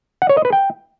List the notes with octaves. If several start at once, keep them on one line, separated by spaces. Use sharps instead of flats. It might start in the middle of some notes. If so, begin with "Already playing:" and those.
F#5
C#5
D#5
B4
G5